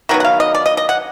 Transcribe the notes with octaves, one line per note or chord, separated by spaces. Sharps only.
D#3 F#3 B3 F#4
F#5
F5
D#5
D5
D#5
D#5
F#5